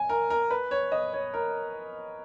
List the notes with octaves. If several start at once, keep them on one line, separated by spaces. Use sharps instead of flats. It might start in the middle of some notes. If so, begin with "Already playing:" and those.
Already playing: G#5
A#4
A#4
B4
C#5
D#5
C#5
A#4